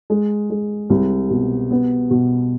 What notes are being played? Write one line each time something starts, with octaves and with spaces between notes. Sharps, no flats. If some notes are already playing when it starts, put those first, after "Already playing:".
G#3
G#3
C2
B2
B3
B2